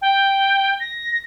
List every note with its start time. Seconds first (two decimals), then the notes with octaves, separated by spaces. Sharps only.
0.02 G5
0.80 A#6